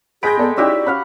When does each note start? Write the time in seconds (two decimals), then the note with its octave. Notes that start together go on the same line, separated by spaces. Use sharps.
0.23 G#3 G#4 G5 B5 G6 A#6 D7
0.39 B3 A4 D5
0.57 C#4 D#4 E4 F#4 G4 D5 E6
0.86 C#4 F5 F#5 B5